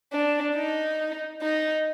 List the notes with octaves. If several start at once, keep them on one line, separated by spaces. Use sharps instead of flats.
D4
D#4
D#4